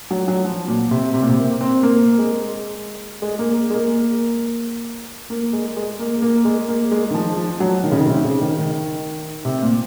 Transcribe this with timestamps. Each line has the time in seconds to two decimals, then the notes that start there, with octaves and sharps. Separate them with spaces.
0.10 F#3
0.28 F#3
0.45 F3
0.68 A#2
0.91 C3
1.14 C3
1.22 A#2
1.29 C3
1.38 A#3
1.61 C4
1.83 A#3
2.18 G#3
3.22 G#3
3.39 A#3
3.70 G#3
3.74 A#3
5.30 A#3
5.53 G#3
5.76 G#3
5.99 A#3
6.22 A#3
6.45 G#3
6.68 A#3
6.91 G#3
7.10 D#3
7.14 F3
7.37 F3
7.60 F#3
7.83 D#3
7.92 C#3
7.99 D#3
8.07 C3
8.24 C#3
8.41 D#3
8.58 D#3
9.45 C3
9.62 A#2